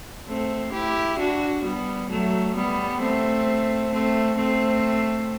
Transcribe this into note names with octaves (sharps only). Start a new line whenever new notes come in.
A3 C4
E4 G4
D4 F#4
G3 B3
F#3 A3
G3 B3
A3 C4
A3 C4
A3 C4